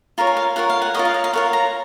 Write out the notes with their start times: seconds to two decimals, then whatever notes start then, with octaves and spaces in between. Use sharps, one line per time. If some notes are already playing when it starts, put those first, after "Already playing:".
0.18 F4 A#4 C#5 A#5
0.27 G#5
0.37 F5
0.56 F4 A#4 C#5 F#5
0.70 F5
0.82 F#5
0.94 F4 A#4 C#5 D#5
1.05 F5
1.14 D#5
1.24 F5
1.33 F4 A#4 C#5 F#5
1.53 A#5